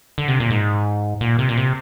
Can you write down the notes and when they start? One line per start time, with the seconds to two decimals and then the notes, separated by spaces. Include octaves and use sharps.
0.18 D3
0.28 C3
0.40 A#2
0.50 G#2
1.21 A#2
1.39 C3
1.49 A#2
1.57 C3